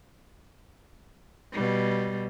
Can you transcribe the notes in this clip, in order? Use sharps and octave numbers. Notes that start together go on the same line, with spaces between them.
B2 G3